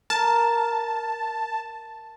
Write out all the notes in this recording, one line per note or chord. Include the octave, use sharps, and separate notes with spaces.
A#4 A5